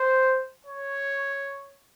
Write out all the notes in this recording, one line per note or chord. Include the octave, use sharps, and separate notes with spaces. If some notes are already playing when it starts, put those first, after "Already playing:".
Already playing: C5
C#5